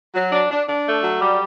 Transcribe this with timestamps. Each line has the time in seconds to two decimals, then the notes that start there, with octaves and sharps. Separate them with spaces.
0.15 F#3
0.33 D4
0.50 D4
0.67 D4
0.85 A3
1.03 F#3
1.21 G3